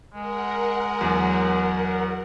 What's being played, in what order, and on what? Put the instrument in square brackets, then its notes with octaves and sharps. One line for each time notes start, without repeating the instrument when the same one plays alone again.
[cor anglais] G#3 [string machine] A#4 F#5
[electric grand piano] E2 F#3